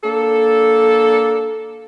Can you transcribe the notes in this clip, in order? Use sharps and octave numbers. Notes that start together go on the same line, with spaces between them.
A#3 D4 A4